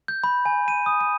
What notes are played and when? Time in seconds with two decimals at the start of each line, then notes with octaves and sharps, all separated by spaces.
0.08 G6
0.24 B5
0.45 G#5
0.68 D#7
0.86 D#6
1.01 D#7